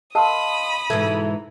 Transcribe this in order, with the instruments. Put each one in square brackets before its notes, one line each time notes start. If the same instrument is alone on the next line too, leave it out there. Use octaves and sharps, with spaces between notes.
[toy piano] A#4 A5 [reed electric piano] D#5 F5 C6 [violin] B5 D#6
[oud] G#2 B2 E3 [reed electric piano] A4 E5 G#6